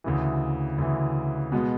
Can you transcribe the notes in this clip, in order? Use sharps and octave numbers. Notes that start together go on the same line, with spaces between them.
D2 C#3 E3
D2 C#3 E3
B2 G#3 B3